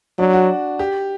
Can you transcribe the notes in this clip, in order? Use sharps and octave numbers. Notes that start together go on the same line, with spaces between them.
F#3 D4
F#4
G4